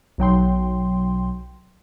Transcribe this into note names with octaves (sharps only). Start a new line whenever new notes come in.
B1 F#3 G5 C6